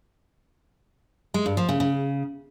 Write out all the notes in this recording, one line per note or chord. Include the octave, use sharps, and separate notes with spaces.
G#3
G2
F3
C#3
C#3